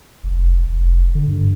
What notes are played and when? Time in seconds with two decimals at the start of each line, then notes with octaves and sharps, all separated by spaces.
0.23 F1
0.65 F1
1.15 D3
1.28 G2